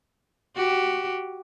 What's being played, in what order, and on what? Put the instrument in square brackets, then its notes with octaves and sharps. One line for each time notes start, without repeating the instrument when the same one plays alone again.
[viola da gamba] F#4 G4